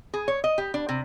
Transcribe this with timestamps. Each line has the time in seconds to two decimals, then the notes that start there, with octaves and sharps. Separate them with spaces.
0.14 G#4
0.28 C#5
0.44 D#5
0.58 G4
0.74 D4
0.89 C3